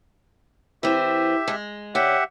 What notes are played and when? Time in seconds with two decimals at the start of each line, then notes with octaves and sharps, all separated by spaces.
0.83 E3 C4 G4 E5
1.48 G#3
1.95 D3 C#4 G4 E5 F#5